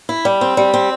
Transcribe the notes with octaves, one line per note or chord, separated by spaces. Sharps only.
E4
G3
C4
G3
C4